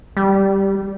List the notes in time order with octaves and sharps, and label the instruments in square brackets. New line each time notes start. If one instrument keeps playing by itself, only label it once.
[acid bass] G3